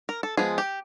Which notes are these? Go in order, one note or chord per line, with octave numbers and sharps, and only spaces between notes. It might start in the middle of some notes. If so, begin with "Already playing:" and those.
A#4
A4
F3 G#3 B3 G#4
G4